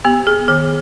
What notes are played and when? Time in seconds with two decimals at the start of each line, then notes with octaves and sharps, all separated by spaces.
0.05 B3 G4
0.27 G#4
0.48 D#3 G#4